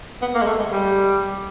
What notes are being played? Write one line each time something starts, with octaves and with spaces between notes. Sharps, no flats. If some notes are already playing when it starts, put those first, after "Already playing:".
B3
A#3
G#3
A3
G#3
G3